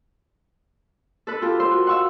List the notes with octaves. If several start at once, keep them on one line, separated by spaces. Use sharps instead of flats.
A4 B4
F4 G4 A4
A#4 C5 C6 E6
F#4
F5 F#5 C6 C#6 E6